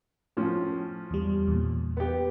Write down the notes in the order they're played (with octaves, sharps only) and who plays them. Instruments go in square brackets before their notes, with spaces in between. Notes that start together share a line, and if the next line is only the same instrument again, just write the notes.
[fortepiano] A2 F3 C#4
[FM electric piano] E2 G3
E2 A#2
[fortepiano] B3 G4